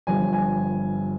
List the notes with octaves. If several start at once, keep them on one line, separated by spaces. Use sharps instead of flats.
G1 G2 F3 G#5
G#5